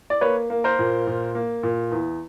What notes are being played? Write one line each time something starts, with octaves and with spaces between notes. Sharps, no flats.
D5
A#3 B4 C#5
A#3
A#4 C5
A#2
A#2
A#3
A#2
E2